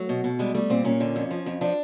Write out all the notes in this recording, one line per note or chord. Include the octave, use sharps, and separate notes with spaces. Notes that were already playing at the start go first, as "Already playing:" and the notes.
Already playing: F#3 A3
B2
B2
G3 G#3
G3 A3
A#2 C4
A#2 C#4
D3
F2
F3
F2
F3 D4